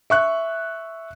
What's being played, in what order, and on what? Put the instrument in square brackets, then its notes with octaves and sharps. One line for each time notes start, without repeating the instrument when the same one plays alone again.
[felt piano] E5 C#6 F#6